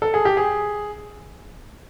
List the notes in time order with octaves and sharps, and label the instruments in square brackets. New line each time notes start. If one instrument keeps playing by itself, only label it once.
[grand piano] A4
G#4
G4
G#4